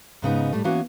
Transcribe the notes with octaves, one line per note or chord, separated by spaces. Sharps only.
G#2 C#3 B3 D#4
A2 G3 A3
E3 A#3 B3 C#4 F#4